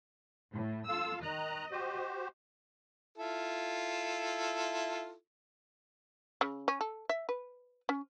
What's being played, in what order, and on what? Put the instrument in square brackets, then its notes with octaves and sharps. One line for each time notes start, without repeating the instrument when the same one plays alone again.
[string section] A2
[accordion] F4 A4 F5 [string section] E6
[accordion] D#3 A#5 F#6 [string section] D#5
[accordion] F#4 G4 C5
[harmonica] E4 F4 A4
[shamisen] C#3
C#4
A4
E5
B4
C#4